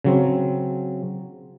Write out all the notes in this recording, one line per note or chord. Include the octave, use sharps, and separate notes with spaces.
C#3 F#3 C4